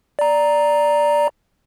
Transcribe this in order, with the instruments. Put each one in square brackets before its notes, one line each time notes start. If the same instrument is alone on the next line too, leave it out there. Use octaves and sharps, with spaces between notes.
[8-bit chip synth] D5 A#5